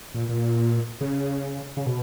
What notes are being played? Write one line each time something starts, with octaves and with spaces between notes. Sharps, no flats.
A#2
A#2
C#3
C#3
B2